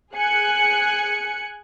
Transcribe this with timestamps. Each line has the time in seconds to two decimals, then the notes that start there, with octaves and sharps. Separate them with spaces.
0.13 G#4 G#5 F#6 C#7